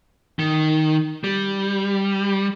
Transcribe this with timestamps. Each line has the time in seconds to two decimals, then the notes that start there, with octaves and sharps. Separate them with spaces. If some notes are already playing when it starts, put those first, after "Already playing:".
0.39 D#3
1.24 G3